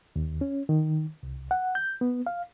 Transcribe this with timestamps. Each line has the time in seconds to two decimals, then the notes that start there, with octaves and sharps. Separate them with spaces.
0.16 D#2
0.41 C#4
0.69 D#3
1.23 C2
1.51 F#5
1.75 G6
2.01 B3
2.27 F5